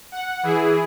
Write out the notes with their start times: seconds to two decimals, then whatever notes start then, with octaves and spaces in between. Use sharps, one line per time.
0.12 F#5
0.43 E3 E4 G#4